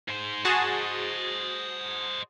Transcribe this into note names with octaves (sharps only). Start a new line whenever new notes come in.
G#2 C5
F#4 G#4 C5 D#5 A5